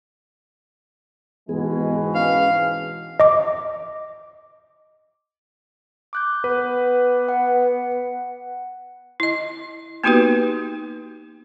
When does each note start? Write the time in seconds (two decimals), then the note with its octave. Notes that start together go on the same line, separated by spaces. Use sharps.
1.49 G#2 B2 E3 G#3 B3 G#4
2.15 C#4 B4 F5
3.20 D#5 D6
6.13 D6 F#6 G6
6.44 B3 B4
7.29 F#5
9.20 E4 D#5
10.04 A#3 B3 D#4 F#4 G4 B4